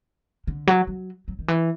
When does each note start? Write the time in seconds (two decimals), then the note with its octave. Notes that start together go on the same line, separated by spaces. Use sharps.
0.47 D3
0.67 F#3
0.87 F#3
1.28 F#3
1.39 D#3
1.48 E3